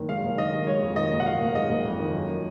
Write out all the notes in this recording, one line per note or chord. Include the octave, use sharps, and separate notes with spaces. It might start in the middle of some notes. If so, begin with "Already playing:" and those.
Already playing: F#1 D#3
G#3 F5
F#1
D#3 D#5
D#3
G#3 C#5
F2
D#3 D#5
F#1
F#5
D#3 F5
F#1
G#3 D#5
F#1
F2
D#3
F#2